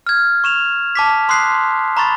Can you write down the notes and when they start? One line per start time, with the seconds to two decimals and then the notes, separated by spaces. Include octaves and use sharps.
0.07 F6 G#6
0.44 C#6 E7 F7
0.95 A5 D6 B6
1.29 C6 D#6 F#6 C7
1.97 A#5 B5 C#6 A6